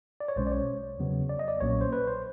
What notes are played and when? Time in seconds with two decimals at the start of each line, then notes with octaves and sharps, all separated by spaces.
0.20 D5
0.28 C#5
0.36 B1 B2 G#3 C#4 C5
0.47 D5
0.52 C#5
0.99 E2 C#3 F#3 B3
1.29 D5
1.39 D#5
1.48 D5
1.61 B1 A#2 F#3 A#3 C#4 C#5
1.81 C5
1.93 B4
2.07 C5